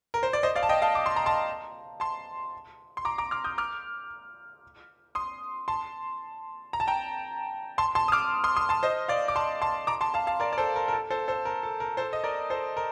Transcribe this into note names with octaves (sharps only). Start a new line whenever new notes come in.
A#4
C5
D5
C5 D#5
D5 F5
A5
D#5 G5
F5 A5
D6
C6
A#5
A5 C6
A5 C6
C6
A#5 D6
A#5 D6
D6 F6
D#6 G6
D6 F6
C6 D#6
A5 C6
A#5
A5
G5 A#5
A5 C6
A5 C6
D#6
D6 F6
C6 D#6
C6 D#6
A5 C6
C5 D#5
D5 F5
D6
A5 C6
A5 C6
A#5 D6
A5 C6
F5 A5
F5 A5
A#4 D5
D5
A4 C5
A#4
A#4
A4
A4 C5
A4 C5
A#4
A4
A#4
A4 C5
D#5
A#4 D5
A4 C5
A#4